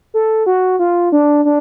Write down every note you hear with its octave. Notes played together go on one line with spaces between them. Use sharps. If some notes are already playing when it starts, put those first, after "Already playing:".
A4
F#4
F4
D4
D4